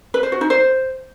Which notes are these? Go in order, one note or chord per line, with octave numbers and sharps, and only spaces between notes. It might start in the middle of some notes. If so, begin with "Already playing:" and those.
B4
C5
F#4
D#4
C5